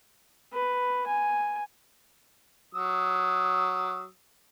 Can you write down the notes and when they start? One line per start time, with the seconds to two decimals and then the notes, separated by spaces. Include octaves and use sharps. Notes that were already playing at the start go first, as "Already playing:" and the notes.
0.53 B4
1.07 G#5
2.75 F#3 D#6 E6